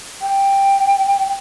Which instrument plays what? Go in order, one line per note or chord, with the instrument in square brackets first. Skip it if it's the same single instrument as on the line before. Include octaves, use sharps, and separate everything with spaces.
[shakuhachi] G5